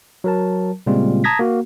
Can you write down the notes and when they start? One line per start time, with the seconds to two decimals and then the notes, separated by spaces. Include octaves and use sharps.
0.24 F#3 A#4 A5
0.86 A#2 C#3 G3 G#3 C4 F4
1.24 A5 A#5 D#6 G#6 A#6 B6
1.39 A#3 F#4